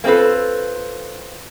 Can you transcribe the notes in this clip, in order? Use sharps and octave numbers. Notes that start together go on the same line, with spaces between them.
A#3 C4 F4 A4 B4